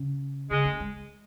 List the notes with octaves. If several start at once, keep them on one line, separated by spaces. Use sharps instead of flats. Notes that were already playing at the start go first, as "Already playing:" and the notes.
Already playing: C#3
C#3 G#3
A3
G#3